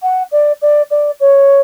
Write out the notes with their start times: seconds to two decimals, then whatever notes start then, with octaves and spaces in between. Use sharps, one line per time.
0.03 F#5
0.32 D5
0.62 D5
0.91 D5
1.20 C#5